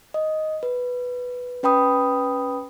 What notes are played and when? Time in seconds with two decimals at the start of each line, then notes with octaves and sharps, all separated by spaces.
0.14 D#5
0.63 B4
1.63 C#4 B4 G5 B5 D#6